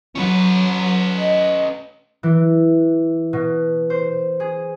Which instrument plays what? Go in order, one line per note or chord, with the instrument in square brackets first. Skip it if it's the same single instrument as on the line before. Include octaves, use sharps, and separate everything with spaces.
[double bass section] F#3 [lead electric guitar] C#4 B4
[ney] D#5
[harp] E3
B2
C5
G#4